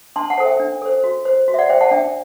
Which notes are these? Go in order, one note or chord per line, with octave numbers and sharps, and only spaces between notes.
D4 A5 C6
F#5 A5
A4 C5
E5 G5
D4
A4 C5
F#4
C5
F#4
E5
D5 F#5
C5 E5 G5
F#5 A5
D4 E5 G5